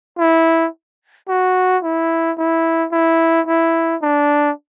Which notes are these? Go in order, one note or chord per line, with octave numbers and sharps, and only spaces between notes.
E4
F#4
E4
E4
E4
E4
D4